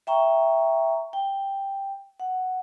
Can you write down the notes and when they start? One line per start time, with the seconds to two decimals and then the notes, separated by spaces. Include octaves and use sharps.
0.07 E5 G5 A#5 C#6
1.13 G5
2.20 F#5